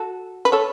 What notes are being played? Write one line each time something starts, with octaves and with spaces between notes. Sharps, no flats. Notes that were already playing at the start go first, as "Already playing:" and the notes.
Already playing: F#4 A4
B4
A4 C#5